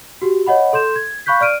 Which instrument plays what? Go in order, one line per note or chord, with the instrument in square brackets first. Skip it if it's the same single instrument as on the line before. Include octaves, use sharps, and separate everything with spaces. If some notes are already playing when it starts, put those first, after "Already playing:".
[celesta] F#4 G4
C#5 D#5 F#5 B5
A4 C6 G6 E7
G#6
F5 B5 C#6 F#6 G6 B6
D5 F6 D7 D#7